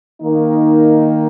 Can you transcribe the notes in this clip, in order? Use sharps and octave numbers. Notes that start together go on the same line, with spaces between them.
D#3 A#3 D#4